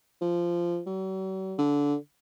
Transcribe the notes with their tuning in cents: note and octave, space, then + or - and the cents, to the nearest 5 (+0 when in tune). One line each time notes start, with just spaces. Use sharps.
F3 -15
F#3 +45
D3 -20